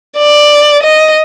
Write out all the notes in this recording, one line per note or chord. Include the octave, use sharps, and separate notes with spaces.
D5
D#5